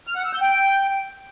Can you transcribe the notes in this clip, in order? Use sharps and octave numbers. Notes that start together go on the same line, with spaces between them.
F6
F#5
E6
G6
G5